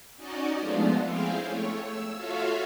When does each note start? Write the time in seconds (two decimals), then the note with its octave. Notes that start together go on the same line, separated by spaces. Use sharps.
0.17 C#4 D#4 F#4 D5 D#5
0.59 F3 G#3 A3 B3 D4 F4
1.03 C4 E4 G#4 F5 G5
1.43 A3 C#5
1.83 E6
2.15 F4 F#4 A4 C#5 E5 F5